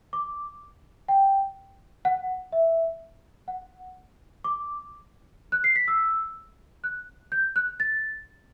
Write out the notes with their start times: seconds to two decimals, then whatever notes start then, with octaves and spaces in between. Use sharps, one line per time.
0.13 D6
1.08 G5
2.05 F#5
2.52 E5
3.48 F#5
4.44 D6
5.52 F#6
5.64 C7
5.76 B6
5.88 E6
6.84 F#6
7.32 G6
7.56 F#6
7.80 A6